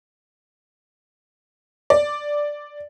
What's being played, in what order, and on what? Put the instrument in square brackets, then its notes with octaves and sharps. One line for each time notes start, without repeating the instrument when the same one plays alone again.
[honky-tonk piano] D5